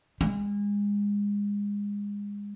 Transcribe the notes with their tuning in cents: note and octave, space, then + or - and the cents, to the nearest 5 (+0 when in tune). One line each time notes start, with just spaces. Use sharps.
G#3 -30